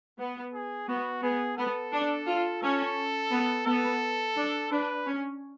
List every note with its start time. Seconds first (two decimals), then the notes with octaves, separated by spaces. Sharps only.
0.19 B3
0.53 G#4
0.88 B3 F#4
1.22 B3 G#4
1.57 B3 A4
1.93 D4
2.27 F4
2.62 C#4 A4
3.31 B3
3.66 B3 A4
4.36 D4
4.71 D4 B4
5.06 C#4